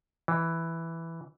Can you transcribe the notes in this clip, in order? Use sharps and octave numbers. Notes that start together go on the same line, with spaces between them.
E3